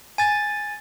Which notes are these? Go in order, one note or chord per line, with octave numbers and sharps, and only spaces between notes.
G#5 A6